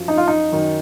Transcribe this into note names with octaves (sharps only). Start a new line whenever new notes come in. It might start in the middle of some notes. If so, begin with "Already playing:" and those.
Already playing: F#2 F3
D#4
F4
D#4
F#2 D#3